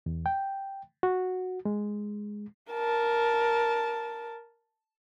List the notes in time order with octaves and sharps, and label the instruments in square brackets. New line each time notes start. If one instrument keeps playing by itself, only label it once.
[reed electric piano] E2
G5
F#4
G#3
[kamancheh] A#4 A5